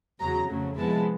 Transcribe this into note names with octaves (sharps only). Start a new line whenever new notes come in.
E2 C#3 F#3 A#5
F2 C#3 F#3 A3
C3 F3 G#3 B3 E4 A5